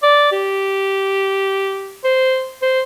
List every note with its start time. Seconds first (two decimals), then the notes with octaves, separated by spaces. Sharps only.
0.03 D5
0.32 G4
2.04 C5
2.62 C5